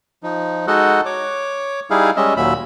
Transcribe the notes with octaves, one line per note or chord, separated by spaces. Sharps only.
F3 D#4
G#3 D#4 F#4 A4 D#5 F#5
C#5 D6
G3 D#4 E4 G#4 F5
G3 G#3 C#4 D#5 E5
D#2 A#2 F#3 E5 B5